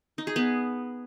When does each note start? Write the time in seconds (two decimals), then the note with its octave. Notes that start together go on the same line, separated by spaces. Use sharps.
0.18 D#4
0.27 G#4
0.36 B3